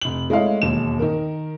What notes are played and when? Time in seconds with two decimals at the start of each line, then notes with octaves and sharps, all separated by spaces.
0.01 F1 F#7
0.30 G#3 A3 E4 C#5 F5
0.62 E1 D#2 E7
0.99 D#3 A#4